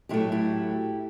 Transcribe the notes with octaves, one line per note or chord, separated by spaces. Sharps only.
A2 F#3 A3 E4 G4
E4 G4